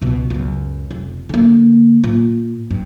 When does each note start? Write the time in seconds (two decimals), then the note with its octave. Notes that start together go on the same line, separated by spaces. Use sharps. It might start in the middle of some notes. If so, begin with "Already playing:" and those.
0.01 C#2 B2
0.30 C#2 F#2
0.91 F1
1.29 D3 A#3
2.04 A#2
2.71 G2